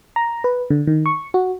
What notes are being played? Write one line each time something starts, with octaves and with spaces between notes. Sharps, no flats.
A#5
B4
D3
D#3
C#6
F#4